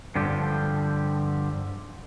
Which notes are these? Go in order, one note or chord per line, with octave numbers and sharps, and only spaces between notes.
G2 D3 F3 G4